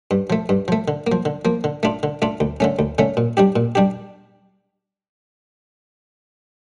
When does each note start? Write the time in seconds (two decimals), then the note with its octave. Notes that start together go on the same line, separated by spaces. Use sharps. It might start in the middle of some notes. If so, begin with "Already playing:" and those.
0.11 G2
0.30 F3 A3
0.49 G2
0.68 F3 A3
0.88 D3
1.07 A#3
1.12 F3
1.25 D3
1.45 F3 A#3
1.64 D3
1.83 A3 D4 F4
2.03 D3
2.22 A3 D4 F4
2.40 D2
2.60 D3 A3 C#4
2.79 D2
2.98 D3 A3 C#4
3.17 A#2
3.37 G3 D4 G4
3.56 A#2
3.75 G3 D4 G4